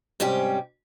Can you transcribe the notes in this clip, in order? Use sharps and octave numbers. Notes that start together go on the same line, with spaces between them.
G#2 C3 G3 C#4 G4